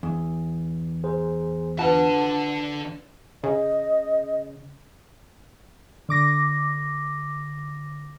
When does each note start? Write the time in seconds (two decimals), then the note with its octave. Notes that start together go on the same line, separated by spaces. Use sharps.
0.03 E2
1.04 G#4 C5
1.79 D3 F4 B4 F#5 A5
3.44 C#3 D#5
6.09 D3 D6 A#6